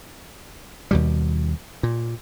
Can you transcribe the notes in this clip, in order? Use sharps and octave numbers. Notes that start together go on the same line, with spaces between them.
D#2 B2 G3
A#2